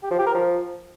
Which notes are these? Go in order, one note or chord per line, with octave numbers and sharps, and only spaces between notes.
G4
F3
G4
A#4
F3